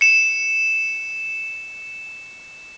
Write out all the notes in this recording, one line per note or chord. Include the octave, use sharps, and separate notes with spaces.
C#7 E7